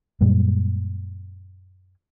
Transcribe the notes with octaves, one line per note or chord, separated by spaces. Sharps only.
F#2 A#2 G3 G#3